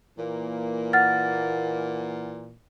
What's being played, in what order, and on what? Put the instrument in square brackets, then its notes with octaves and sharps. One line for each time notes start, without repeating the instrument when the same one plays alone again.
[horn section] A#2 E3 A#3
[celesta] F#5 F6 A6